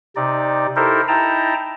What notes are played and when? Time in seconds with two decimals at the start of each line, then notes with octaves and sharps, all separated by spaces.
0.16 C3 D#4 D5
0.76 D#4 E4 G4 A4 A#4 C5
1.08 D#4 E4 G5 A5 A#5